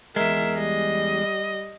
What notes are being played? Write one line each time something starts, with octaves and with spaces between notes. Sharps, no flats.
E2 G#3 A#4 E5
G3 D#5